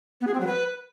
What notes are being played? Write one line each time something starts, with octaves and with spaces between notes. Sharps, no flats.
B3
G#4
C4
F#3
B4